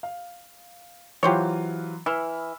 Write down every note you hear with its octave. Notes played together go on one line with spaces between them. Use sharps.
F5
E3 F#3 F4 G4 C5 C#5
E3 B5 E6 F6